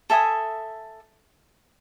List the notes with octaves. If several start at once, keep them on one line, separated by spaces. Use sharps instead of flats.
A4 E5 G#5 D#6